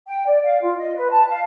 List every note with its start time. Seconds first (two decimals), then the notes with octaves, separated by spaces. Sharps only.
0.07 G5
0.26 D5
0.43 F5
0.62 F4
0.78 D#5
0.96 B4
1.10 A5
1.29 F5